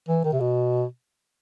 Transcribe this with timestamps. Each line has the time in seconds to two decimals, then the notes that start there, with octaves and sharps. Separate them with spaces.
0.09 E3
0.24 D#3
0.33 C3
0.40 B2